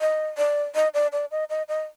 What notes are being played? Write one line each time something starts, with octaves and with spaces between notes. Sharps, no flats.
D#5
D5
D#5
D5
D5
D#5
D#5
D#5